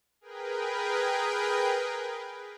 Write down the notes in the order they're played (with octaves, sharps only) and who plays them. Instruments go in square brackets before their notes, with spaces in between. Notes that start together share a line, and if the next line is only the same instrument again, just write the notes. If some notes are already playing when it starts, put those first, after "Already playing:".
[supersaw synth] G#4 A#4 B4 G5